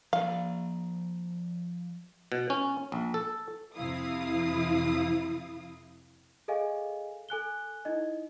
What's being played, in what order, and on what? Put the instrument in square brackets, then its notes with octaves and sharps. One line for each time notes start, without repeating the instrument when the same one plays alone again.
[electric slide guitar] F3 D5 [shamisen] F5
[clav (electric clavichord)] B2
C#4
A#1
A4
[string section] F2 C3 F3 E4 F5 D#6
[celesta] G#4 A4 D#5 F5 G#5
A4 G#5 F#6 G7
D#4 E4 D#5